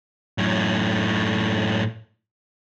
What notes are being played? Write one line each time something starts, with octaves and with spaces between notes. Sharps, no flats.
F#2 A2